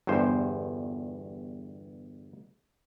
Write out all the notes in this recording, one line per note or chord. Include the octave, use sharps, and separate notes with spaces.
G1 E2 G2 C5